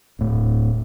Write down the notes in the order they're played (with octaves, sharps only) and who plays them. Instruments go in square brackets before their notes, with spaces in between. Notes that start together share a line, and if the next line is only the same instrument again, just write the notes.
[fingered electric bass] D1 A2